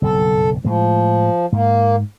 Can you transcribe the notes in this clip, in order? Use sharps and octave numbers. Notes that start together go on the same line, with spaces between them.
F#1 B1 G2 A4
A2 F3 G#3
G#2 A#3